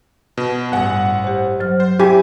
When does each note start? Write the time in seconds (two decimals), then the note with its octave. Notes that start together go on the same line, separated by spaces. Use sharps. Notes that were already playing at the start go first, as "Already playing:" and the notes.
0.37 B2
0.72 A1 G2 G3 F#5 G#5 F#6
1.24 G4 C5
1.60 F#3 C5 F6
1.80 F#3 C5
2.00 E4 G4 G5 G#5 D6